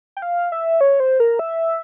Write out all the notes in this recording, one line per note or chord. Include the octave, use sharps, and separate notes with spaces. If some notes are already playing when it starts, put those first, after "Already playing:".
G5
F5
E5
C#5
C5
A#4
E5